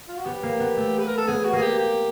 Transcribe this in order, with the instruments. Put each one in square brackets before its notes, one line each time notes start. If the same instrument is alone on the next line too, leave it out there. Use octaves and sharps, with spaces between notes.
[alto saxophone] F4
F#4
[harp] B3 [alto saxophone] G4
[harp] A#3
B3
A3
[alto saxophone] B4
A#4
A4
[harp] B3 [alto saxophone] G#4
[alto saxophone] F#4
[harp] A#3 [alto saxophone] G#4
[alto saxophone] G4
G4